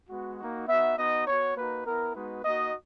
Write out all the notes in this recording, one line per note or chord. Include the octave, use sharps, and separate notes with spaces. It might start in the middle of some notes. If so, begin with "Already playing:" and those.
G#3 B3 F#4
A#3 D#4 F#4
B3 D#4 F#4 E5
B3 D#4 F#4 D#5
B3 F#4 C#5
A#3 D#4 F#4 B4
B3 E4 A#4
G#3 B3 D#4 F#4 B4
A#3 D#4 F#4 D#5